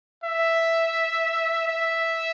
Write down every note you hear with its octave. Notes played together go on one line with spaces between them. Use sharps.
E5
E5